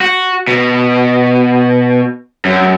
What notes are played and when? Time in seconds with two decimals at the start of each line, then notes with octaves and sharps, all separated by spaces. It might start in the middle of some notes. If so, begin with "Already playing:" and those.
0.01 F#4
0.48 B2
2.45 F#2